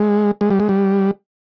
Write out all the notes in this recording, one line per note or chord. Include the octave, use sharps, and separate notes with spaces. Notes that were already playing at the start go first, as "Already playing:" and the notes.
Already playing: G#3
G#3
G3
G#3
G3